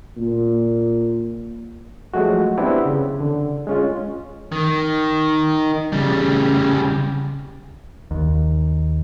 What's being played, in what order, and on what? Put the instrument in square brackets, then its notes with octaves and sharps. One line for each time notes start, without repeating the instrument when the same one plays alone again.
[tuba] A#2
[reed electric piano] F3 F#3 G#3 A3 F#4
B3 C4 D4 E4 G4
C#3
D3
G#3 C#4 F4
[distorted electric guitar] D#3
C#3 G3
[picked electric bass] D#2